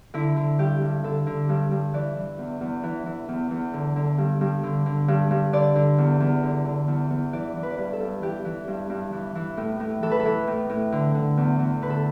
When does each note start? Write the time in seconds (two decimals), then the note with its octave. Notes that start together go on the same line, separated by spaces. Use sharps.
0.14 D3 E4
0.36 D3
0.58 G2 G4
0.81 G2
1.04 D3 A4
1.27 D3
1.49 G2
1.71 G2
1.94 E3 D5
2.16 E3
2.39 E2
2.61 E2
2.83 E3
3.06 E3
3.29 E2
3.51 E2
3.73 D3
3.96 D3
4.18 G2
4.41 G2
4.63 D3
4.86 D3
5.08 G2
5.31 G2
5.53 D3 D5
5.75 D3
5.98 E2
6.20 E2
6.43 D3
6.65 D3
6.88 E2
7.10 E2
7.33 E3 D5
7.56 E3
7.63 B4
7.71 D5
7.78 G2 B4
7.93 A4
8.00 G2
8.22 E3 G4
8.45 E3
8.68 G2
8.90 G2
9.12 E3
9.35 E3
9.57 A2
9.80 A2
10.02 E3 A4
10.11 B4
10.20 A4
10.25 E3
10.47 A2
10.70 A2
10.92 D3
11.15 D3
11.37 E2
11.59 E2
11.82 D3 B4
11.90 A4